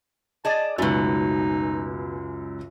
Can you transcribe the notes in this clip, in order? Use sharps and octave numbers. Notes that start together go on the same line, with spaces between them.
G#4 D5 D#5 A5
C#2 F#2 B2 A3 D#4